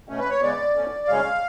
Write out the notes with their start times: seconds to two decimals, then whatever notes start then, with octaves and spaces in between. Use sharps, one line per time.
0.09 B2 A3 C#4
0.19 B4
0.30 C#5
0.41 C#3 G#3 B3 D5
0.75 B2 A3 C#4
1.08 F#2 C#3 G#3 C#4 F5